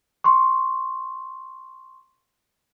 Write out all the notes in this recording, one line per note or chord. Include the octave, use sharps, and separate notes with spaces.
C6 C#6